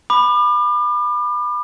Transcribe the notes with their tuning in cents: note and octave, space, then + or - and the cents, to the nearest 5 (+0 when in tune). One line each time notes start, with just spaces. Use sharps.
B5 +0 D6 +40